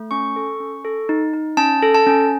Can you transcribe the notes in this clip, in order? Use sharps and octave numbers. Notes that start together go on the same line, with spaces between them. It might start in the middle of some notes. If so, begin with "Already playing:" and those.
Already playing: A3
C#4 C#6
A4
C#4
A4
D#4
D#4
C#4 A5
A4
A5
C#4